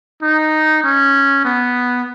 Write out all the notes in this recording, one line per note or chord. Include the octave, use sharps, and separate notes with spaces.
D#4
C#4
B3